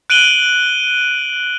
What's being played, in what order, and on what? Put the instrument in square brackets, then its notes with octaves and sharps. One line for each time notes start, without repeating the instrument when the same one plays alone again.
[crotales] F#6 D7 D#7 F#7 G7